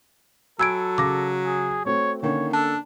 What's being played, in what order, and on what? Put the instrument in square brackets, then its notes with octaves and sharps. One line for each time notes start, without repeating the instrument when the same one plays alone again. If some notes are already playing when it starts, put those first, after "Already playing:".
[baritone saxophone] F#3 [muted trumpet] A4 [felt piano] G#5 B5 [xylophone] E6 G#6 D7
[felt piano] C#3 A#6 [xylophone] D6
[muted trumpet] G#4
[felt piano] A3 C4 F#4 [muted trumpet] C#5
[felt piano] D3 A#3 C#4 [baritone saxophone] D#3 [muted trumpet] C#5
[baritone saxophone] D4 [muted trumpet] A4 [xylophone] A5